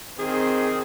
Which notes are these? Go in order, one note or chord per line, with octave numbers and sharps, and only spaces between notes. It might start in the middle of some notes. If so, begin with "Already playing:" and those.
D#3 C4 G#4